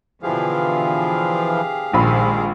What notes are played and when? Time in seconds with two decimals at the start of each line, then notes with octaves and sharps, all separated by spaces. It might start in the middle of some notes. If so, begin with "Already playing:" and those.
0.23 B2 D3 E3 F3 G4 G#4 F5
1.93 A#1 D#3 G#3 C5 B5